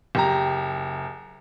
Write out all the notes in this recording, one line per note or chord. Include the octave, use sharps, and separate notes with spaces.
F#1 G4 A#5